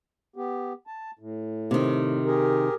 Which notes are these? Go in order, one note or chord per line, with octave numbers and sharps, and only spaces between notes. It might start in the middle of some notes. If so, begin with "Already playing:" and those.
B3 G4
A5
A2
C3 D#3
G4 G#4 A#4